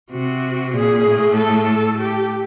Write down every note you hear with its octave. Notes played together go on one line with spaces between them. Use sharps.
C3 F#4
A#2 G#4
A2
A4
G4